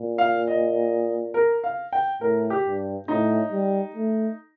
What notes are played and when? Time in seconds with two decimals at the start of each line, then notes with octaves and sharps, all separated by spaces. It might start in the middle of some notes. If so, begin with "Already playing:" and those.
Already playing: A#2
0.18 F5
0.47 D#5
1.34 A#4
1.64 F5
1.93 G5
2.21 A2 A#4
2.50 G4
2.65 G2
3.08 A2 D#4
3.51 G3
3.96 A3